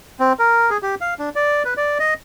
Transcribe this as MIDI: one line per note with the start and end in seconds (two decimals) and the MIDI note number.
0.20 0.33 60
0.39 0.70 70
0.70 0.77 68
0.82 0.95 67
1.01 1.14 77
1.19 1.29 62
1.35 1.63 74
1.65 1.74 71
1.77 1.98 74
1.99 2.14 75